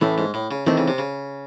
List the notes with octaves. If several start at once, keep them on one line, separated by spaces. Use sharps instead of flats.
A2 E3 A3 C#4
G#2
A2
C#3
D#3 E3 A3 C4 D#4
C#3
C3
C#3